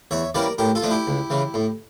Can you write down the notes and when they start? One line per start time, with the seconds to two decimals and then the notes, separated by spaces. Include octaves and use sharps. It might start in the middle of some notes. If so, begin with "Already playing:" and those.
0.11 E2 C#5 E5
0.34 E3 G3 A#3 C#4 A#4 D5
0.58 A2 G4 A#4
0.75 F4 A4
0.83 F3 A3 D4
0.90 E4 G4
1.07 C#2
1.30 C#3 E3
1.54 A2